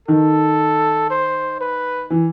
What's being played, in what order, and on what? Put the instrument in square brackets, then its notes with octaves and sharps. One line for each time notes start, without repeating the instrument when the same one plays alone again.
[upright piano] D#3 [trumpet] A4
[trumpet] C5
B4
[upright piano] E3